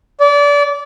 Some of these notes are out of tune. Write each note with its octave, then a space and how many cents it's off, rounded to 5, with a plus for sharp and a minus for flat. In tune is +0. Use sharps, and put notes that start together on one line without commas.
D5 -30